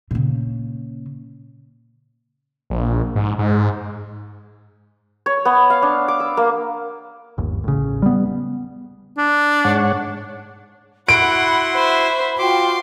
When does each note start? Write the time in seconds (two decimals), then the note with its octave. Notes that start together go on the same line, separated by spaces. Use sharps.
0.11 A#2 C#3
2.70 A#1
3.15 G#2
3.39 G#2
5.26 C#5
5.45 B3
5.70 F5
5.82 D4
6.08 D6
6.20 E6
6.37 A#3
7.38 G1 D#2
7.64 A1 C#3
8.02 G3 B3
9.17 D4
9.65 G#2 C#5 F#5
11.09 E4 F#4 F#5 B5 C6 D7
11.75 C5 E5
12.39 F4 F#4 G5 C6 D6